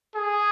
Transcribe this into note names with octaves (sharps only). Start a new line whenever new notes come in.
G#4